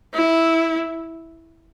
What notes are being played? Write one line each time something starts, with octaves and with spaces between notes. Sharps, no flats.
E4